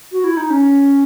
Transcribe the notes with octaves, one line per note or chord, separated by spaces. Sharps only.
F#4
E4
D#4
C#4